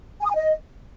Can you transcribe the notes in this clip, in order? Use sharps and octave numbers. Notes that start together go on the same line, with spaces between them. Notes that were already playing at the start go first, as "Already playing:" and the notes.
G#5
D#6
G#5
D#5